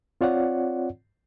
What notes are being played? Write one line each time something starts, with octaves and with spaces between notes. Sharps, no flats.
C4 F4 C#5 D5 F#5